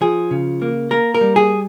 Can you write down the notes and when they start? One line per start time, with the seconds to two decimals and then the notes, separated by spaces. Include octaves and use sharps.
0.01 F3 G#4
0.31 C#3
0.62 A#3
0.91 A#3 A#4
1.15 A#4
1.21 G3
1.36 G#4